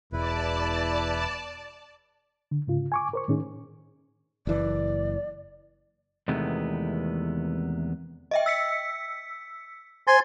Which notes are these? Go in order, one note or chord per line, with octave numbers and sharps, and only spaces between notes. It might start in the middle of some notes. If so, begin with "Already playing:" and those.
E1 E2 E4 B4 D5 A5
D3
G#2 C#3 F4
G#5 C#6 D6
A#4 C5 C#6
A2 D#3 C#4 D#4 G#4
F#1 E3 D5
E2 C3 D#3 G#3 A3 B3
D#5 E5 G5
E6 B6 C#7
C5 G#5 C6 A6